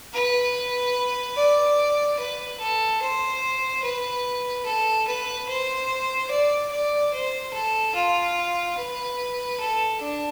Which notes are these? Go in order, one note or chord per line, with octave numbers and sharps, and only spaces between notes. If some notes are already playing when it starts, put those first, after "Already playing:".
B4
D5
B4
A4
C5
B4
A4
B4
C5
D5
D5
C5
A4
F4
B4
A4
D4